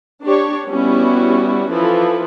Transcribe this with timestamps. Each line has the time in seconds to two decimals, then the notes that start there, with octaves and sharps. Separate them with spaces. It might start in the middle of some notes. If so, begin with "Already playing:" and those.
0.23 D4 G4 C#5
0.67 G3 B3 C#4 E4 F#4
1.71 E3 F3 A4 B4